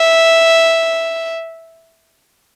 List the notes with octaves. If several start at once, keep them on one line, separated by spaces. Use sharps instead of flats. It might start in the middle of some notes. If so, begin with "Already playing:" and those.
Already playing: E5